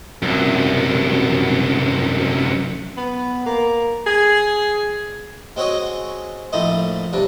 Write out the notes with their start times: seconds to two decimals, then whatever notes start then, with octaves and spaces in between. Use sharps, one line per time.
0.22 C2 F#2
2.97 B3
3.46 A#3
4.07 G#4
5.56 G#3 C4 F#4 C#5 D#5
6.52 A#1 A2 A3 C5 D#5
7.13 G2 C3 D4